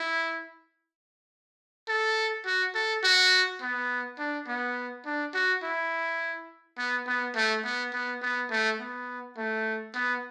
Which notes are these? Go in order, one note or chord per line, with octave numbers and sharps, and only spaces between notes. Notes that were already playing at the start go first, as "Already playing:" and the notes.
Already playing: E4
A4
F#4
A4
F#4
B3
D4
B3
D4
F#4
E4
B3
B3
A3
B3
B3
B3
A3
B3
A3
B3